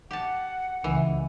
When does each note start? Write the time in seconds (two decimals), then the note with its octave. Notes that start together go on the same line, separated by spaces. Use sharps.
0.11 G4 F#5 A5
0.84 C#2 E3